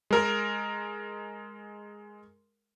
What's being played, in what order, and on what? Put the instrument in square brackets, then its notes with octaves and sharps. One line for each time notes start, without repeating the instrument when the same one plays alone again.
[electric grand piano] G#3 A#4